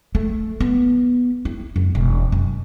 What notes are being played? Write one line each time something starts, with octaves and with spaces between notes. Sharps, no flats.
A3
B3
E4
F#2
E1
F#2